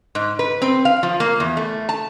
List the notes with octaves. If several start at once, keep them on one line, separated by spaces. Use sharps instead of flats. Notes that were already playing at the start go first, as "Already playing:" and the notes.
G#2
B4
C4
F5
F3
A#3
E2
A3
A5